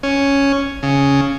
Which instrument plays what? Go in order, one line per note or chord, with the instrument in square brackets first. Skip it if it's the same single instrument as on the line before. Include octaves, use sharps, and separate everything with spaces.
[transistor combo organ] C#4
C#3